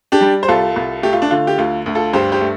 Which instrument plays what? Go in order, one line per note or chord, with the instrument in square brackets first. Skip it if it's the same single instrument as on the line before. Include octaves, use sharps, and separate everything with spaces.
[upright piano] D4 G4
G3
C5
C2 F4 A4
C2
A3 G4
F4
D4
D3 F4
G4
D2 F4
D2
F4 A4
G2 G4 C5
G4 C5
A3